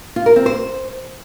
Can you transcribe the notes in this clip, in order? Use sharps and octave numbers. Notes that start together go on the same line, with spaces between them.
F4
A#4
C4
C5